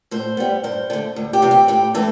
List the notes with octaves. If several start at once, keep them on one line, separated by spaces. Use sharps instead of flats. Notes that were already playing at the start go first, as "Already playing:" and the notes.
A2 C5
G3 B3
G2 C5
D3 A3
D2
G4
C3 E3
G4
A2 G4
E3 A3 A4